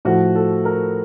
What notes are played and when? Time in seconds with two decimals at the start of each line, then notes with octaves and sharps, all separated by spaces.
0.05 A2 F3 F#4
0.35 A4
0.65 A#4